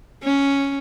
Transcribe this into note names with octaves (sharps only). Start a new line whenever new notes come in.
C#4